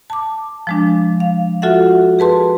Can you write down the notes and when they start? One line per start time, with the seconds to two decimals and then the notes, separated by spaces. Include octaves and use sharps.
0.10 A5 D6
0.67 F3 G#3 D4
1.20 F5
1.62 F4 F#4 A4 E5 F#5
2.19 G#4 B4 A5 C6